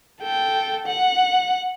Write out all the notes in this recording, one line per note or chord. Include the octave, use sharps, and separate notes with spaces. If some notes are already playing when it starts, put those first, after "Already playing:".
A4 G5
F#5